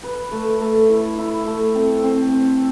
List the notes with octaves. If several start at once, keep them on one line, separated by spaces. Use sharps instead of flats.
B4
A3
A3
E4
E4
A3
C4
C4
C4